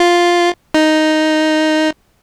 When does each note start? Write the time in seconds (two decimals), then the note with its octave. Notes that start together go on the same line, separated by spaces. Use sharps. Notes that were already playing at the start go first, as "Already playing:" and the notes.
Already playing: F4
0.74 D#4